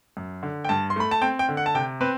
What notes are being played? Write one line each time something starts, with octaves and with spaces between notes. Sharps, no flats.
F#2
D3
G5
G2 A5
C6
A3 B5
A5
C4 G5
G5
D3
F#5
A5
C3 G5
C4 B4